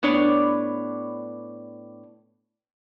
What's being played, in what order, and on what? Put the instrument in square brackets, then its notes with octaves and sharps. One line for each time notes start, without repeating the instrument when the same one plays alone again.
[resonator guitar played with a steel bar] A2 B3 D4 C#5 D5